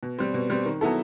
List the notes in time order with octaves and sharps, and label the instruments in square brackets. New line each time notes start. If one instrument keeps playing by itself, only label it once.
[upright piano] B2
G3 C4
B2
G3 C4
D#3
F#3 B3 E4 A4